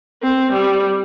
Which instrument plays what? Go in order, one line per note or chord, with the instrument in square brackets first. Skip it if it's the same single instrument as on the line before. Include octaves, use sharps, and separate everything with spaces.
[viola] C4
G3